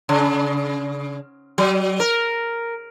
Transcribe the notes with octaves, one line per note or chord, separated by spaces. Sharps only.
C#3
F#3
A#4